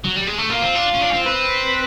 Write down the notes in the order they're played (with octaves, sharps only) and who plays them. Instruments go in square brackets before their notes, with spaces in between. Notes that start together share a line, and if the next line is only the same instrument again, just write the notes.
[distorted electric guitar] F#3
G3
G#3
A3
[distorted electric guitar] A#3 [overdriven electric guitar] F4
[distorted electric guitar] C4
D4
C#4
D4
C#4
C4
[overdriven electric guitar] B4